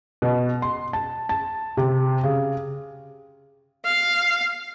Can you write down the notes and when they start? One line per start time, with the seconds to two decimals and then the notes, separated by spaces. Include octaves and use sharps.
0.22 B2
0.62 C6
0.93 A5
1.29 A5
1.77 C3
2.23 C#3
3.85 F5